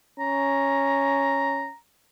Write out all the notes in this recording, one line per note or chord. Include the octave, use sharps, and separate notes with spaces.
C#4 A#5